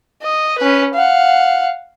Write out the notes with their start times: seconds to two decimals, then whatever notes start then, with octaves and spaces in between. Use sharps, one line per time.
0.22 D#5
0.58 C#4 B4
0.94 F5 F#5